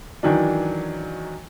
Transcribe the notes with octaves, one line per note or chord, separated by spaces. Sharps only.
D#3 E3 F#3 D4